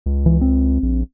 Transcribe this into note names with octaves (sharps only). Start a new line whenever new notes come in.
C#2
E3
C4
A#1